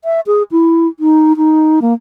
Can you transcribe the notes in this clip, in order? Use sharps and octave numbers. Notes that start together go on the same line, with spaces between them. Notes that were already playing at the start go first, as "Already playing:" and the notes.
E5
G#4
E4
D#4
D#4
A#3